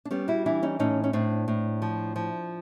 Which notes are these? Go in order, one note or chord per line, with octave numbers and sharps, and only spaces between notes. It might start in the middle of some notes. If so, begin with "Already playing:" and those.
D4
G3 B3 C#4
E4 F#4
E3 D4 E4
C#4 D#4
A2 C#4 D#4
C#4
A2 C4 D4
A2
F3
F3